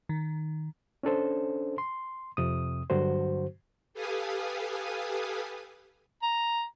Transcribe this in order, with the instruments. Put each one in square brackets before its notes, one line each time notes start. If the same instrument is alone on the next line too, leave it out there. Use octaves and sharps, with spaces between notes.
[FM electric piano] D#3
[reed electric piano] C#4 D4 A4 C5
C6
F2 C3 D#6
G2 D3 F#3 F#4 C5
[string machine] G4 A4 B4 F5 G#5 D#6
[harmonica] A#5